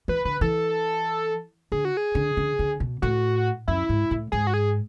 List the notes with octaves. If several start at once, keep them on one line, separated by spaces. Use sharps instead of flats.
E3 B4
D3 B4
E3 A4
D3 G#4
F#4
G#4
D3
D3
D3
B2
A2 F#4
F#2 E4
G#2
A2
G#2 G#4
F#4
G#4